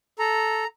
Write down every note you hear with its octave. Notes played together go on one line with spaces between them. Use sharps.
A4 A#5